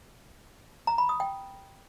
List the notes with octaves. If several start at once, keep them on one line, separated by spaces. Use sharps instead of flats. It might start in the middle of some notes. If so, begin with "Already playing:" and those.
A#5
B5
D#6
G5